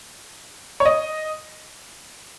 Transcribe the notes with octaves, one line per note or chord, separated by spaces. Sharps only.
C#5
D#5